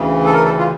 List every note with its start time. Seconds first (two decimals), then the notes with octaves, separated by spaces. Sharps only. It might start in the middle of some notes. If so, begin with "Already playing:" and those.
Already playing: D2 C#3 E3
0.26 A4
0.34 A#4
0.44 A4
0.59 F4